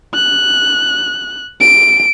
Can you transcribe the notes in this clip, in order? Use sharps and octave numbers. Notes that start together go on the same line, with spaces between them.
F#6
D7